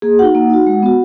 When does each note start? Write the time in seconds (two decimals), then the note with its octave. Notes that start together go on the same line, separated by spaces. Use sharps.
0.02 A#3 G#4
0.19 D#4 F#4 F#5
0.35 A#3
0.50 D#4 F#4
0.67 G#3
0.83 B3 F#4